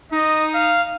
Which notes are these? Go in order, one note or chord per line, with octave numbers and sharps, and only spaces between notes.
D#4 D#5
F5